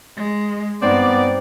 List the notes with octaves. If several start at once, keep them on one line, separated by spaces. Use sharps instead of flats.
G#3
G2 B3 C4 D#4 D5